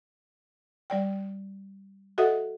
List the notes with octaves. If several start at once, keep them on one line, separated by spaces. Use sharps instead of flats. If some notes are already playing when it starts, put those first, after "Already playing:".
G3 D5 G5
F#4 A4 D#5 E5 F#5 D#6